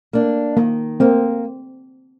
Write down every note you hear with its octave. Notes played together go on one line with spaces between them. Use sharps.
A#3 D4
D#3 A#3
A#3 C4